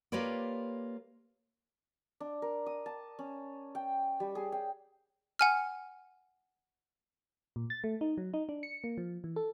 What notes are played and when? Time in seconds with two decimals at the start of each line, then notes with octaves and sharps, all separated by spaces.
0.12 A#3 F4 G4 B4 C#5 D5
2.20 D4
2.42 A#4
2.66 D#6
2.86 A5
3.19 C#4
3.75 G5
4.20 G3
4.35 G#4
4.52 G5
5.39 F#5 G#5 F6
7.56 A#2
7.70 A6
7.84 A3
8.01 D#4
8.18 F#3
8.34 D#4
8.49 D4
8.63 C#7
8.84 A#3
8.98 F3
9.24 E3
9.36 A4